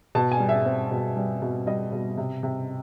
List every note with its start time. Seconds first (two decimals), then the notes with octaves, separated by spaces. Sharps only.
0.15 B2 A5
0.32 G#5
0.40 G3
0.49 E5
0.66 C4
0.91 B2
1.17 G3
1.42 B2
1.67 G3 D#5
1.92 B2
2.17 C3
2.43 C3